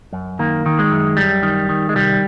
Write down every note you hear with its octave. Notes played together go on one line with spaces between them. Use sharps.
F#2
D#3 A#3
D#3
G#3
F#2
F#2 G3
D#3
D#3
G#3
C2 G3